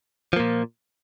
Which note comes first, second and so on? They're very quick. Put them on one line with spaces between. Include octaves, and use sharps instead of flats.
F3 A#3 A#2